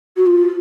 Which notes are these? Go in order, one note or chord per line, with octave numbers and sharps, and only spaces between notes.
F#4
F4